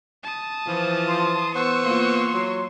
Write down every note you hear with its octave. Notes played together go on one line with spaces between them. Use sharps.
A5 D#6
E3 F3
C6
B3 C5 F#5 C#6 E6
A#3 F4 C6
F#3